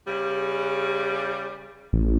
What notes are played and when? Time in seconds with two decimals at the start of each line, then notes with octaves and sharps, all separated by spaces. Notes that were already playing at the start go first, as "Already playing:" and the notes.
0.07 E2 C#3 G3
1.93 A1